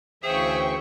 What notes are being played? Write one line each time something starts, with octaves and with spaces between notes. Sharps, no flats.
D2 C#3 E3 G#4 C5 E5 G5 C#6